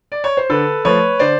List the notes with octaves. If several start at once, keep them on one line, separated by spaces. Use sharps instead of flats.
D5
C#5
C5
D3 A4 B4
F3 A3 B4 C#5
D3 C5 D5